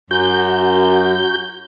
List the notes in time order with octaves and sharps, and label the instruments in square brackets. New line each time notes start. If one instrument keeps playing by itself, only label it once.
[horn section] F#2 [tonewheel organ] F#4 G6